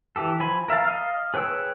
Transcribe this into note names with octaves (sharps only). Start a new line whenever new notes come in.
E3 G4 A4
F3 G#5 B5
A#4 E5 F5 A5
D#5 F5
G#4 B4 C#5 G5 E6